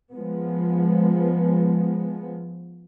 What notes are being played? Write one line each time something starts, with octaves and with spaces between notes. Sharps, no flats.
F3 G#3 B3